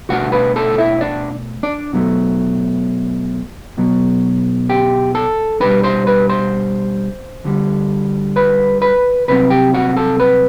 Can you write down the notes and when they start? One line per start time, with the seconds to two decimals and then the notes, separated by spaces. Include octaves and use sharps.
0.09 B2 A3 D4 F#4 F#5
0.32 B4 B5
0.56 A4 A5
0.78 E4 E5
1.01 D4 D5
1.63 D4 D5
1.93 B2 F#3 A3
3.77 B1 B2 F#3
4.69 G4 G5
5.15 A4 A5
5.60 B2 G3 D4 B4 B5
5.83 C5 C6
6.07 B4 B5
6.29 C5 C6
7.44 D2 D3 G3
8.36 B4 B5
8.82 B4 B5
9.28 C2 C3 F#3 C4 B4 B5
9.50 G4 G5
9.74 F#4 F#5
9.96 A4 A5
10.20 B4 B5